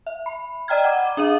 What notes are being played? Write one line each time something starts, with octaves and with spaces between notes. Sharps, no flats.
E5
B5
D5 D#5 G5 A#5 F6 G#6
F#5 D6
D4 G#4 F5 D#7